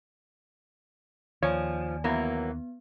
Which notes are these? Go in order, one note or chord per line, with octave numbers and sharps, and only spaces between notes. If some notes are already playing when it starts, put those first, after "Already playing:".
D#2 F3 C#5 D5 G#5
E3 F#3 A#3 B3